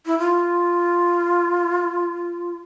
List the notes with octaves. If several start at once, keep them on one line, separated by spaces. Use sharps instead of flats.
E4
F4